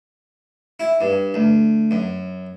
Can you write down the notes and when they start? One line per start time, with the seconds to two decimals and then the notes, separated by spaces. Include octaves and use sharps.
0.80 E4
1.01 G2
1.34 D2
1.91 F#2